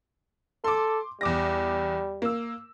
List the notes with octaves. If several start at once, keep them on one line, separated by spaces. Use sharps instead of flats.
A4 C6 D6
E2 G3 D6 A#6
A#3 E6